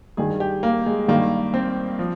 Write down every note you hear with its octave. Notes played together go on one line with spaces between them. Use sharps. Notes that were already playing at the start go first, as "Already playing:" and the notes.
G2 D#3 G#4
G4
A#3
G#3
G2 D#3 A#3
C4
F3